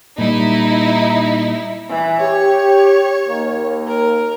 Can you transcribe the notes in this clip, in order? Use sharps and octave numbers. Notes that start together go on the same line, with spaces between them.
A#2 G3 D#4 E4
E3
G4 C#5
D#2 A#3
A#4